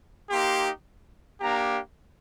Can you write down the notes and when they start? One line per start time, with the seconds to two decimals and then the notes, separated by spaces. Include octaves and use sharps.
0.30 A#3 D#4 G4 C6
1.40 A#3 D4 G4 A#5